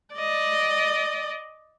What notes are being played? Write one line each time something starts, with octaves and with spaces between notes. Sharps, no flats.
D5 D#5